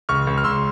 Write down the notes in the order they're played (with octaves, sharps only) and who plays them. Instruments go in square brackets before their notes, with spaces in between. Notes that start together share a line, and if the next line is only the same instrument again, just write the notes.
[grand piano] C#2 [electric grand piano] C#6 F6
[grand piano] C#2
[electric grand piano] F6
[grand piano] C#2 [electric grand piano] C6 E6